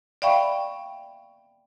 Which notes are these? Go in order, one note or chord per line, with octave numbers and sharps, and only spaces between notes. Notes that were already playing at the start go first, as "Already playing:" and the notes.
D5 E5 F5 G5 B5 C#6